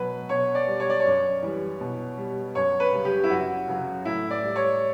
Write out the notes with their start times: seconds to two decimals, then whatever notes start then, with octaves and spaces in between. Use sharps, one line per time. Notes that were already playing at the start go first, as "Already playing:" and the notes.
Already playing: B2 F#3 B4
0.29 B2 C#5
0.55 D5
0.67 G3
0.80 C#5
0.90 D5
1.00 C#5
1.05 F#2
1.42 E3 G3
1.80 B2
2.18 G3
2.55 F#2 C#5
2.80 B4
2.93 C#3 G3
3.05 G4
3.24 E4
3.30 F#2 F#4
3.68 C#3 F#3
4.05 A2 E4
4.31 D5
4.43 G3
4.56 C#5